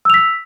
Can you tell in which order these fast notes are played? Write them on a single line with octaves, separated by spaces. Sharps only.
E6 F7 B6